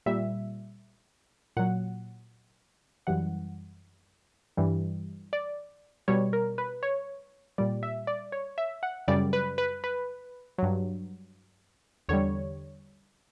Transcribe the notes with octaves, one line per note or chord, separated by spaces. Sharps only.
A#2 G3 E5
A#2 F#3 F#5
F#2 E3 G3 F#5
G2 E3 G3
D5
B2 G3 C#5
A#4
B4
C#5
A#2 G3 D5
E5
D5
C#5
E5
F#5
F#2 C#3 G3 D5
B4
B4
B4
G2 F#3
E2 D3 G3 C#5